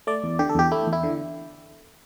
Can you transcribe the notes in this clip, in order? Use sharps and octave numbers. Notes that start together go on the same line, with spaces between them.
A3 D5
E2
D3 G4
A4
E2 G4
A3 E4
E2
E4
D3